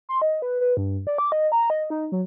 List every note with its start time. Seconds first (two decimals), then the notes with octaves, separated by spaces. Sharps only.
0.09 C6
0.22 D#5
0.42 B4
0.61 B4
0.77 G2
1.07 D5
1.18 D6
1.32 D#5
1.52 A#5
1.70 D#5
1.90 D#4
2.12 F#3